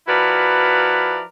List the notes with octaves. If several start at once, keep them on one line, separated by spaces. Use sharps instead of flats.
F3 E4 F#4 A#4 B4 D5